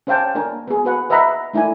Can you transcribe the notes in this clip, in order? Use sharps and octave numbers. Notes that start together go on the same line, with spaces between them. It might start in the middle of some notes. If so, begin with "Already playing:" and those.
C#4 C5 F5 G5 A5
A#3 D4 A#4 G#5
B3 G#4
F#4 B4 F#5
B4 D#5 E5 F#5 A#5 B5
A3 D#4 E4 D5 G#5